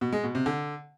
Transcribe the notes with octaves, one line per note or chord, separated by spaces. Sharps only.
B2
G#3
B2
C3
D3